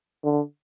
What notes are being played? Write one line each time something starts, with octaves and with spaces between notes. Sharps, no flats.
D3